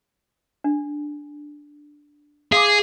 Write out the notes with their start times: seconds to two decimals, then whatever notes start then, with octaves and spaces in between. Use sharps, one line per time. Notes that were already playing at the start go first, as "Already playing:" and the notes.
0.64 D4
2.52 G#4 F5 C6 D6